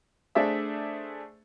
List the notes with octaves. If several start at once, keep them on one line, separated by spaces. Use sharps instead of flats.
A3 D4 G#4 C5 D5 E5